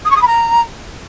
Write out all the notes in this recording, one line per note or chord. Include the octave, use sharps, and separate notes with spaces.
D#6
C#6
D#6
B5
A#5